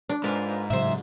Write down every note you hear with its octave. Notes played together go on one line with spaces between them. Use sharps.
D4
G#2 F4 A#4 B4
A2 C#3 F#3 C5 E5